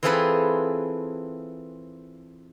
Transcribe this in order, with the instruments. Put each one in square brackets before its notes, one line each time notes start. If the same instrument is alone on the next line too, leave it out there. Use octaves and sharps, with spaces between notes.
[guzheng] E3 C4 F4 G#4 A4 B4